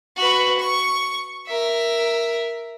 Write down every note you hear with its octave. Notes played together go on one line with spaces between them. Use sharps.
F#4 B4
C#6
A#4 E5